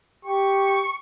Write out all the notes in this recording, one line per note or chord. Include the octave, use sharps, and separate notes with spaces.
G4 C#6